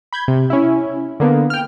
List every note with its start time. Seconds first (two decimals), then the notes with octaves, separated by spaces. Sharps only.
0.13 B5 G6 G#6
0.28 C3
0.50 C#4 E4
1.20 D3 A#3 B3
1.50 G5 F6